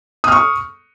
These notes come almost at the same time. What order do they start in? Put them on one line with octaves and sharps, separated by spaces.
D#6 F6 C#6